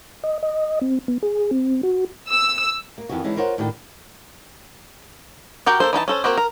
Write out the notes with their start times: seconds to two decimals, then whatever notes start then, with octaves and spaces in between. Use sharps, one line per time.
0.24 D#5
0.43 D#5
0.81 C4
1.08 B3
1.23 G#4
1.51 C4
1.83 F#4
2.29 E6
2.98 A#3
3.09 F2 D#3 E3 B3 F#4
3.24 D3 E3 G#3 C#4 D#4
3.37 F4 A#4 C5 C#5 F#5
3.58 A2 D#3 D4 F#4 G5
5.66 F#4 G4 A#4 G5
5.80 A#3 A4 C5
5.93 E3 D#4 F4 A5
6.08 C#4 A4 C5
6.24 A#3 C4 F#4 G4
6.38 A#4